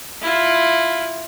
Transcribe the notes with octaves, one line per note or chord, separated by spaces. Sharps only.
E4 F4